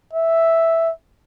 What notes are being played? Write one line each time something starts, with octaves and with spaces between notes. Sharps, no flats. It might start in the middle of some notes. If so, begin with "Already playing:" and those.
E5